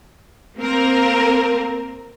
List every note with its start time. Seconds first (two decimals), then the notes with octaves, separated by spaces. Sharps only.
0.59 A#3 C4 A#4